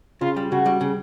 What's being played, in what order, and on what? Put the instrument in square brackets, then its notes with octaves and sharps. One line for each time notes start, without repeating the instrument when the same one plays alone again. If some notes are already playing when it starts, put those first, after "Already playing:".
[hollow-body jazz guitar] C#3 [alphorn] F4
[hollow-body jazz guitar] G3
[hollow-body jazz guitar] C#3 [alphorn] F#4
[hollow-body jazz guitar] G3
C#3